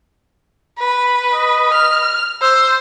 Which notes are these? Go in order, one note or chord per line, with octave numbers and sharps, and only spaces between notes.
B4
D#5
F6
C5 E6